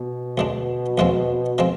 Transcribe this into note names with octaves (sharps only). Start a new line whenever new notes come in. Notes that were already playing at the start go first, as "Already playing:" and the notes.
Already playing: B2
D2 D3 G#3 D4
D#2 D3 F3 G#3 C4
D3 F3 G#3 C4